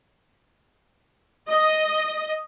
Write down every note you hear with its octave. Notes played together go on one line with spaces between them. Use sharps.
D#5